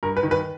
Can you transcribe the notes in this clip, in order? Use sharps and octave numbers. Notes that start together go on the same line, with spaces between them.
G2 A#4
B4
D#3
B4